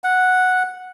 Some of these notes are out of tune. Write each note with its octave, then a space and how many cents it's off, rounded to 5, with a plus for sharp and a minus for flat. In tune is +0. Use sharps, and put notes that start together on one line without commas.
F#5 -5